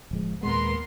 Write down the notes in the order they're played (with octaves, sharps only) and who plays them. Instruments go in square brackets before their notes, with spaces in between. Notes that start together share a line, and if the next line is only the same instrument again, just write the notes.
[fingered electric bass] D1 F3 G#3
[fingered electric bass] D#2 A#2 G#3 [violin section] B3 A#4 C6